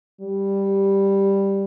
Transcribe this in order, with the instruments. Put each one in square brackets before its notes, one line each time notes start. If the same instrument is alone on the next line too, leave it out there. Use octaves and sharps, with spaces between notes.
[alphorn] G3